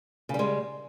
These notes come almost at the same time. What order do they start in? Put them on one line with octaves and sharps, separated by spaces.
C#3 G3 G#3